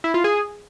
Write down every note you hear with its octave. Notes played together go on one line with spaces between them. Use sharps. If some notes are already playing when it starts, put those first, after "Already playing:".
E4
F4
G#4